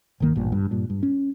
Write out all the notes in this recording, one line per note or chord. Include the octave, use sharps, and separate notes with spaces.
G1 D2 D#3 A#3
A1 G2 A#2
G2
G2 A#2
G2
C#4